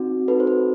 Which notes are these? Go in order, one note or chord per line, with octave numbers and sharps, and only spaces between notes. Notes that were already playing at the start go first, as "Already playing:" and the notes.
Already playing: C4 D#4 F#4
C4 D#4 F#4 A4 B4
C5
B4